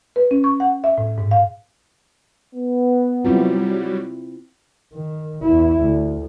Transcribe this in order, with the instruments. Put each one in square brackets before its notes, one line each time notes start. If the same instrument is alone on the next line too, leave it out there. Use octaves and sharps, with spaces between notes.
[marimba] B4
C#4
C#6
F#5
E5
A2
G#2
F5
[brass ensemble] B3
[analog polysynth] F#3 G3 [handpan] C4 E4 F4
[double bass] D#3
E2 E4
D2